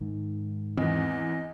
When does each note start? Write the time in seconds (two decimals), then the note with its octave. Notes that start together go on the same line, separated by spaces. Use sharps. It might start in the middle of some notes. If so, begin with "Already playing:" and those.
0.01 G#2 D#3
0.78 E2 E3 C4 D#5